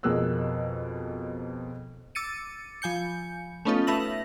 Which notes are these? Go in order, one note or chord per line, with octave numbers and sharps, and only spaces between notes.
F2 B2 G#4 A#4 E6 F#6
D6 E6 A6 C#7 D#7
F3 G#5 G6 C#7
A3 B3 C#4 D#4 F4 A4
A3 B4 E5 E6 A#6 F#7